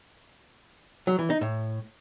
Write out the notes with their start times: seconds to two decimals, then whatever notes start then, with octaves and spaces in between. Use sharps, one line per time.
1.07 F#3
1.19 E3
1.30 D#4
1.41 A2